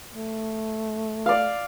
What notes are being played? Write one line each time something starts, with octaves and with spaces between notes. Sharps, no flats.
A3
D5 F5